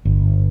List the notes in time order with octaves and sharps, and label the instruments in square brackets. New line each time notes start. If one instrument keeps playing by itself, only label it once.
[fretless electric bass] G1